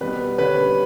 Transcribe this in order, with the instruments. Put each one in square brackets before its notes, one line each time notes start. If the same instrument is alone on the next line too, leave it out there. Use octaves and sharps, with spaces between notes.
[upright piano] B2 G3 B3 [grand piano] B4
[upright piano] D3 G3 C#4 [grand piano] B4